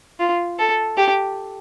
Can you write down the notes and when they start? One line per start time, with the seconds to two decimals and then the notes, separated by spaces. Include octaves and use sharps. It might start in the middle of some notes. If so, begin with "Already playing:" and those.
0.20 F4
0.59 A4
0.98 G4